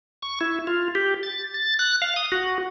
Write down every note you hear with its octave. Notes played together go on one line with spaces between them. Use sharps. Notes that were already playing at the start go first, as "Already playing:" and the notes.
C#6
E4
F4
G4
A6
A6
F#6
F5
D#6
F#4